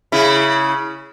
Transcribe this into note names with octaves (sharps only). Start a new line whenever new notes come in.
C#3 E4